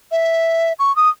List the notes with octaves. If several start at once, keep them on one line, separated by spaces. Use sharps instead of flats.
E5
C#6
D#6